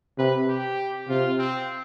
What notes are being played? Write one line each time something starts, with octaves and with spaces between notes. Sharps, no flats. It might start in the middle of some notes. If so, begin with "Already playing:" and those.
C3 B4
G4
C3 F4
C4